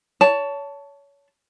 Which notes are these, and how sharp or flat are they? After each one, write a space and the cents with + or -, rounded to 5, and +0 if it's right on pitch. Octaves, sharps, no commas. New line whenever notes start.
C#5 +25 A5 +0